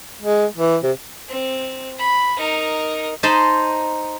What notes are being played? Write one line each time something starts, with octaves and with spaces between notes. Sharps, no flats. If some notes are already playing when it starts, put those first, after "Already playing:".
G#3
E3
C3
C4
B5
D#4 A#4
D#4 C5 D#5 A5 B5 C6